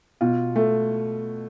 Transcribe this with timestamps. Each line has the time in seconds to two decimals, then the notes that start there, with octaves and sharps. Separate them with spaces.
0.21 B2 F4
0.56 A3